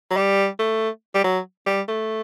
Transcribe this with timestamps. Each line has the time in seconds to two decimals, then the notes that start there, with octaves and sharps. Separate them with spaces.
0.10 F#3
0.17 G3
0.59 A3
1.14 G3
1.24 F#3
1.66 G3
1.88 A3